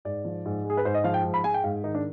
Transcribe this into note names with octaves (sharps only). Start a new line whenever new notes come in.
G#2 D5
F3
G#2
G#3
G#4
B4
G#2 C5
D#5
F3 F5
G5
G#2
B5
G#3 G#5
G5
G#2 F5
D#3 D#4
D4